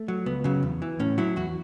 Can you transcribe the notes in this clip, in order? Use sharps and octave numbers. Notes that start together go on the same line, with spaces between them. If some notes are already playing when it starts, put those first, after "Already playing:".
Already playing: A3
F#3
C#2 B3
C#3 F#3
E2
E3
A2 C#4
F#3 E4
E2 F#4